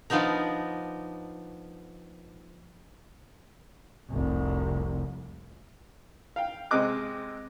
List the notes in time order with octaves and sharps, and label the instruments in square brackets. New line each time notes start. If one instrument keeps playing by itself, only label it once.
[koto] F3 B3 D4 D#4 A#4
[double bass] F1 C2
[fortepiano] F5 G5
C3 G#3 C4 D#5 D6 F#6